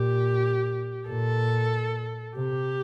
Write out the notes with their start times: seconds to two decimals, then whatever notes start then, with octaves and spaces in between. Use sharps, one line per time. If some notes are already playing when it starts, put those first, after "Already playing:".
Already playing: A#2 G4
1.08 A#2 A4
2.36 C3 G4